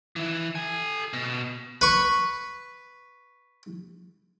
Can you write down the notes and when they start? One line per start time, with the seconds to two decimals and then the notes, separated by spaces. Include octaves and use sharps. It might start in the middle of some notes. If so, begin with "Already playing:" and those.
0.16 E3 E4
0.55 A4 G#5
1.13 B2
1.81 B4 C#6